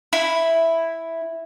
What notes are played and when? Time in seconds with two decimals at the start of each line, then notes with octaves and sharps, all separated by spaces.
0.13 E4